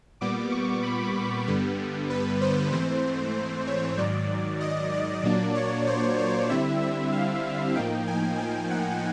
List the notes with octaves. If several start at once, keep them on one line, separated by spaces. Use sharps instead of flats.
A#2 G3 B3 D6
C#6
B5
G2 D3 G3 B3
B4
C5
G#2 E3 A3 C4 C5
C#5
G#2 D#3 F#3 D5
D#5
D5
A#2 F#3 A#3 D4
C#5
C5
C5
D3 G3 C4 E4 E5
E5
F5
A2 F3 A#3 D#4 G5
G#5
G5
F#5